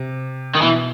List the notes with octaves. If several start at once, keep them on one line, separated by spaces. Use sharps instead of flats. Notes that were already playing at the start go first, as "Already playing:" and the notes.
Already playing: C3
D#3
B2 E3